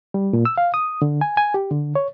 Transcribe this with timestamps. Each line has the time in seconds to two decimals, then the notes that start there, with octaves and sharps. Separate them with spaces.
0.14 G3
0.33 A#2
0.45 E6
0.58 F5
0.74 D#6
1.02 D3
1.21 G#5
1.37 G#5
1.54 G4
1.71 D3
1.95 C#5